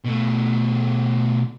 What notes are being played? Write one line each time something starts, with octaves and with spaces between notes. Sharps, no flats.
B2 A3